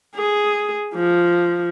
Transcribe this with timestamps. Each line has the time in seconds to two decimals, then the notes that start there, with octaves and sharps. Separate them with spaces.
0.15 G#4
0.95 F3